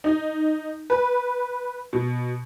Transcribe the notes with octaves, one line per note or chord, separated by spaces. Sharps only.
D#4
B4
B2